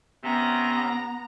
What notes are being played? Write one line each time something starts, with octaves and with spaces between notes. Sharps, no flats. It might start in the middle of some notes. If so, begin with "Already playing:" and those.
C3 B3 C#4 A#5